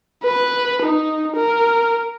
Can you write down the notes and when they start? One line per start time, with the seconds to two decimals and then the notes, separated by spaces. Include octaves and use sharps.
0.23 B4
0.82 D#4
1.36 A#4